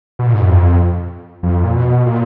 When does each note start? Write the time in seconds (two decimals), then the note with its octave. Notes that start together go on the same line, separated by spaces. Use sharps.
0.19 B2
0.26 A#2
0.34 G#2
0.41 F#2
0.48 F2
1.43 F2
1.64 A#2
1.74 B2
2.06 A#2